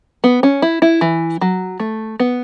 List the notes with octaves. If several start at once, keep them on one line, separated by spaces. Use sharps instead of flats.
B3
C#4
E4
E4
E3
F#3
A3
B3